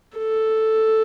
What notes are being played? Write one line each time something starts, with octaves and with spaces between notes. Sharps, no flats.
A4